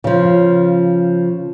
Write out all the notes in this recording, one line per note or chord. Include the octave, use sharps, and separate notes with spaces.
C#3 F3